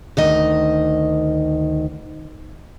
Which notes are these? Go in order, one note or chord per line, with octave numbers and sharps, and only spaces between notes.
D2 D#3 D#5